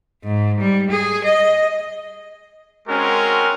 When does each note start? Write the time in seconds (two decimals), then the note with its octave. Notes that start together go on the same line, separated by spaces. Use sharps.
0.24 G#2
0.60 G3
0.90 G#4
1.24 D#5
2.88 G#3 C4 C#4 F#4 A#4